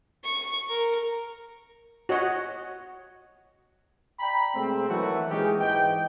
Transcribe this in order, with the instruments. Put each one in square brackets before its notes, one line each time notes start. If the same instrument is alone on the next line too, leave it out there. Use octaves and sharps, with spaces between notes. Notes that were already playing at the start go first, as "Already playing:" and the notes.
[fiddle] C#6
A#4
[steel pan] F#4 C#5 D#5 F#5
[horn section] D5 G5 A#5 B5
B2 G#3 A3 C4
D#3 E3 F#3 A3 E4 F#4
A#2 E3 G#3 C#4 D#4 G4
G#2 E3 D#5 G5